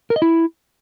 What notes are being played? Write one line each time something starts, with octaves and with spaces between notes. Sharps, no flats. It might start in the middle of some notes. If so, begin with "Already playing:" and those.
A#4
D#5
E4